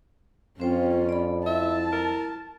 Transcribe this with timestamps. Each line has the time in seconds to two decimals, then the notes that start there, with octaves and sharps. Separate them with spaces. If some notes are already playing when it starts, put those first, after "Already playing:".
0.60 F2 C4 C#4 F4 C5 G5
1.09 D5 B5
1.46 E4 E5 A5
1.93 A#4